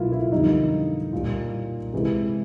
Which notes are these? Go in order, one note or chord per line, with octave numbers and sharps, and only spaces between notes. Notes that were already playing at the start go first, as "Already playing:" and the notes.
Already playing: B2 F#3 A#3 E4 F4
E4
F2 D3 G3 A#3 D#4
A#2 G3 A#3
C3 E3 G#3